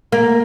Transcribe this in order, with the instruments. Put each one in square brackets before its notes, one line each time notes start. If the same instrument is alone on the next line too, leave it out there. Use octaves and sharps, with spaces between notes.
[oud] A#3